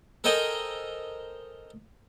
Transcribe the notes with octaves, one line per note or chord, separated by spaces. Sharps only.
A4 A#4 C5 D#5 G5 G#5